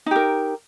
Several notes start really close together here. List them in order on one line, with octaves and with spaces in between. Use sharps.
D#4 G4 A#4